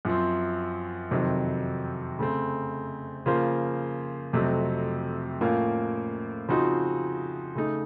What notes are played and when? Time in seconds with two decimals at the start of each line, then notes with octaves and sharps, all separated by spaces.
0.05 F#2 F3 C4
1.11 F2 C3 D#3 F#3
2.19 C#3 A3 C4
3.26 C#3 F3 A#3 F4 C5
4.33 F2 C3 F#3 A3
5.41 A2 F3 A#3 C#4 F4
6.48 C#3 F3 C4 D#4 F#4
7.55 C#3 A3 D#4